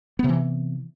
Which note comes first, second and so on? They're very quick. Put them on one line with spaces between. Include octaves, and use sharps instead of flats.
B3 C3 E3